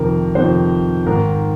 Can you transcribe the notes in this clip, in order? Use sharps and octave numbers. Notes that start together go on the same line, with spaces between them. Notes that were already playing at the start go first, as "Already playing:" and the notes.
Already playing: F2 C3 D#3 A#4
F2 C3 D#3 C5
G#2 D#3 A#4